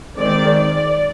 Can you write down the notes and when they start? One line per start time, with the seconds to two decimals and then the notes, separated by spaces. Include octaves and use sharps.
0.17 D#3 G#3 C4 D5
0.57 D5